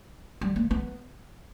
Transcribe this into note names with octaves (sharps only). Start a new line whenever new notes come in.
G3
A#3
B3